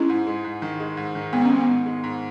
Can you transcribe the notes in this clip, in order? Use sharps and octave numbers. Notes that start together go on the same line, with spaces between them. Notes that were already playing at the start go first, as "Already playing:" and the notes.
Already playing: G#3 C#4 E4
G#2
G#3
G#2
D#3
G#3
G#2
D#3
G#2 B3
C#4
G#2
B3
G#2
G#3
G#2